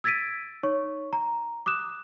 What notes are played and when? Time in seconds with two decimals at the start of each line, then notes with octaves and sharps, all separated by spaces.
0.04 E6 G#6 A6 B6 D7 D#7
0.63 D#4 C#5 C#6
1.13 A#5
1.66 D6 D#6 F#6 E7